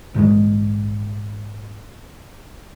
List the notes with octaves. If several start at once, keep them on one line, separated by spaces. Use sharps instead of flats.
A#1 G#2 D3 G#3